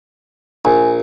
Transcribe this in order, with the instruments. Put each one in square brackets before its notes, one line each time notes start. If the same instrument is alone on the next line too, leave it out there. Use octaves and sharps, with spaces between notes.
[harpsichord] A#1 [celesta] G#5